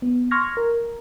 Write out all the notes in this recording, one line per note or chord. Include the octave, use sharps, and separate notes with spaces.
B3
C6 C#6 F6 G#6 A#6
A#4